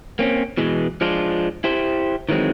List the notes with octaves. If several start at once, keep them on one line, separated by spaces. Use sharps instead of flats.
A#3 C4 C#4
B2 E3 G#3
F3 G#3 D4 F4
E4 G4 C5
D#3 E3 F#3 G#3 C4